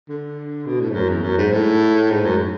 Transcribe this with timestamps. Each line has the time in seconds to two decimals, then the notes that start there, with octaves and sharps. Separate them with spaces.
0.09 D3
0.66 B2
0.81 A2
0.90 G#2
0.95 F#2
1.09 E2
1.23 F#2
1.38 G#2
1.53 A2
2.10 G#2
2.25 F#2